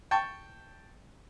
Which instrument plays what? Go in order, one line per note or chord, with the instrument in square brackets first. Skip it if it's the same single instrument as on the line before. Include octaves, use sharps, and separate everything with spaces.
[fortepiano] G5 A5 C#6